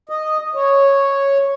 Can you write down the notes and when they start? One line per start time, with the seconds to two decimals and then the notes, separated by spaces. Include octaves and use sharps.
0.09 D#5
0.55 C#5